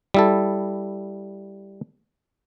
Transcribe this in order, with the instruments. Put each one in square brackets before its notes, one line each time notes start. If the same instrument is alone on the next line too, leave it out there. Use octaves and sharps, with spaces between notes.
[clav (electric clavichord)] G3 E4 A4